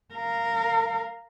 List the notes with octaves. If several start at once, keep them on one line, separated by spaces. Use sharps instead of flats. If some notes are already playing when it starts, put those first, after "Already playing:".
A#4 F5